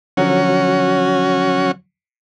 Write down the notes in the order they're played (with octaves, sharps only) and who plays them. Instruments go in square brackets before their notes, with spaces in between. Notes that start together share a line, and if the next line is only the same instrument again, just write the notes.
[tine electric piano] D3 F3 F#3 [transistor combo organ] C#4 F#4